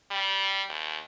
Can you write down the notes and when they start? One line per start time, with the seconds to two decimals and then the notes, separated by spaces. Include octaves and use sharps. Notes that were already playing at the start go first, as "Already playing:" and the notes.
0.11 G3
0.69 D#2